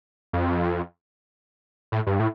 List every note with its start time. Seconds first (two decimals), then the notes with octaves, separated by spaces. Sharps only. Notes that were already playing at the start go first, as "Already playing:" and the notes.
0.33 F2
1.92 A2
2.07 G2
2.19 A2